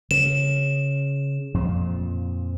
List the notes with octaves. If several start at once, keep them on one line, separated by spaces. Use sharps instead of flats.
C#3 E7
F2 A#2 F3